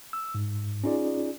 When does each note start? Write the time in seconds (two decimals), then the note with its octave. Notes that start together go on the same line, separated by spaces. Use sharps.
0.13 E6
0.35 G#2
0.84 C#4 D#4 F4 G#4 D5